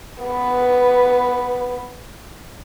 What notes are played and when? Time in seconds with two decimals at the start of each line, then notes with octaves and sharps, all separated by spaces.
0.23 B3 B4